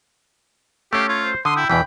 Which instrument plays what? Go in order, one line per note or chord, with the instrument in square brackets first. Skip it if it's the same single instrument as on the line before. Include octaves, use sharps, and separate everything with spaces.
[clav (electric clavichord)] A3 C#4 [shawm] G4 [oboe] F5
[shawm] F4 [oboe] C#5
[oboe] C5
[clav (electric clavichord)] D3 [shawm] C6 [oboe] D#6
[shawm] E4 [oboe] G5
[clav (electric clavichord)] E2 B2 E3 [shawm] G5 [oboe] B5